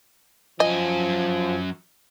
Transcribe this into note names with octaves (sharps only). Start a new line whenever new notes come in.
F#2 F3 D#5 G#5